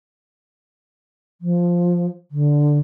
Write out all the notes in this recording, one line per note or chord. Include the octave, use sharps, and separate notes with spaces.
F3
D3